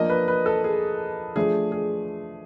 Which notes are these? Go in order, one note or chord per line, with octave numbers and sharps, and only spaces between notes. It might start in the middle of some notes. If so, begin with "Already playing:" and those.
Already playing: F3 A#3 D4 D#5
B4
B4
A4
G#4
F3 A3 D4 G#4
G#4